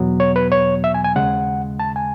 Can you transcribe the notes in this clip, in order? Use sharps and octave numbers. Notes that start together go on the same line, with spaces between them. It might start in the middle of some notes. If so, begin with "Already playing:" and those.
Already playing: E2 B2 F#3 B3
C#5
B4
C#5
E5
G#5
G#5
D#2 C#3 G#3 F#5
A5
G#5